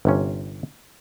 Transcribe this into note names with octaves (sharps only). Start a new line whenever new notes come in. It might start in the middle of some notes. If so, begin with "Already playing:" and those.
G1 C3 C#4